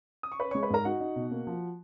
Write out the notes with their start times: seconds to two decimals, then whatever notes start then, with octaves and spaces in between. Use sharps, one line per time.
0.23 D#6
0.32 C#6
0.40 C#4 B4 B5
0.51 G#3 C#5 C#6
0.63 B4 B5
0.70 G#2 A#4 A#5
0.85 D#4 F#4 F#5
1.00 D#4
1.16 B2
1.31 A#3
1.47 F3